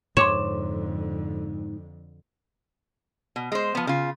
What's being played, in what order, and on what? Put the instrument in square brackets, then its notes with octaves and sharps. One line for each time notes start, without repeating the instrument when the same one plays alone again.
[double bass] F2 D3 [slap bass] G#2 [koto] C#5 [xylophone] C6 D6 E7
[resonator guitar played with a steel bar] B2
G#3 C5
F3 B3
C#3 F4